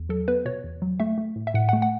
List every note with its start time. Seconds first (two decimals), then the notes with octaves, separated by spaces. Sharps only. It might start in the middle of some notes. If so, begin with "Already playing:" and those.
Already playing: E2
0.09 F#3 A4
0.28 B3 B4
0.45 B2 C#5
0.64 E2
0.82 F#3
1.00 A3 E5
1.18 A3
1.36 A2
1.47 E5
1.54 A2 F#5
1.69 F#5
1.73 A3
1.82 F#5